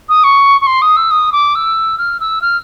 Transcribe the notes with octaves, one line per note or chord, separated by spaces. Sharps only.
D#6
C#6
C#6
C6
D#6
E6
D#6
D6
E6
F6
E6
F6